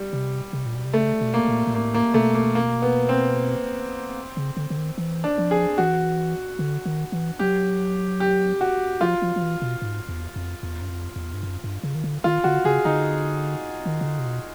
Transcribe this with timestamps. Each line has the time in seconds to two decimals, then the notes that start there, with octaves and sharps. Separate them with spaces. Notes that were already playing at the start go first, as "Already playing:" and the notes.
Already playing: G3
0.13 C3
0.53 C3
0.66 A#2
0.75 B2
0.85 C3
0.93 C#3 A3
1.21 B2
1.34 A#3
1.48 A#2
1.67 A#2
1.74 A2 A#3
1.94 A#3
2.14 B2 A3
2.34 A#3
2.55 A#3
2.82 B3
3.09 C4
4.37 C#3
4.57 D3
4.70 D3
4.77 D#3
4.98 E3
5.24 D4
5.38 F3
5.51 G#4
5.78 E3 F#4
6.59 D3
6.86 D#3
7.12 E3
7.39 F#3 G4
8.20 G4
8.61 F#4
9.01 F3 F4
9.22 F3
9.36 F3
9.42 E3
9.62 B2
9.82 G#2
10.09 E2
10.36 F2
10.63 E2
10.81 F#2
10.89 F2
11.16 E2
11.34 G2
11.43 F#2
11.64 G2
11.83 C#3
11.95 D#3
12.04 D3
12.24 D#3 F4
12.44 D3 F#4
12.65 C#3 G#4
12.85 D3 D#4
13.86 D#3
14.01 C#3
14.06 D3
14.19 C3
14.25 B2